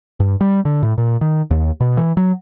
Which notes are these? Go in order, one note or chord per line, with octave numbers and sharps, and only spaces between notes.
G2
G3
D3
A2
A#2
D#3
D#2
B2
E3
F#3